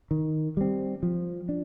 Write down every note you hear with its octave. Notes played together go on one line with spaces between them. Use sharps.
D#3
G3 C4
F3
D4